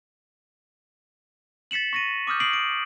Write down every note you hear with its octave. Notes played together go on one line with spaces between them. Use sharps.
A6 B6 C#7 E7 F#7
C#6 A#6 D#7
D6 D#6 F6 G6
D#6 C7 D7 F#7
D7